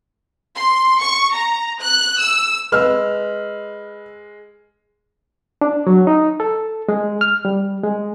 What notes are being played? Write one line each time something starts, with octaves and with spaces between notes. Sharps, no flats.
C6
C#6
A#5
F#6
E6
G#3 B4 E6 F6
D4
F#3
D#4
A4
G#3
F6
G3
G#3